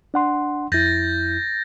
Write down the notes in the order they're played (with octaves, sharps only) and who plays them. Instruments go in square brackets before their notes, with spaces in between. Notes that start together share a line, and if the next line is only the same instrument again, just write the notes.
[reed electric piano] D4 F#5 C6
[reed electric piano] F2 E4 [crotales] G6 A6 A#6